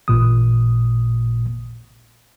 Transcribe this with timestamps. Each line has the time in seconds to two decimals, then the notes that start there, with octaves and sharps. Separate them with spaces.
0.08 A1 A#2 D#6